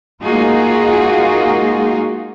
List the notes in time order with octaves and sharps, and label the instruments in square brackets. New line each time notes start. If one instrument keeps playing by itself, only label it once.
[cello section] G#3 A#3 D#4 F4 F#4 G#4